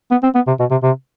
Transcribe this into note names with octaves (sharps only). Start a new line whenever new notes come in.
B3
C4
B3
C3
B2
C3
C3